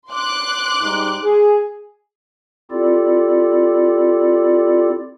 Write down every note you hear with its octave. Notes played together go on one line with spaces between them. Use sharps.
C6 D6 F#6
G#2 G3 D#4
G#4
C4 E4 F4 G4 A4 D5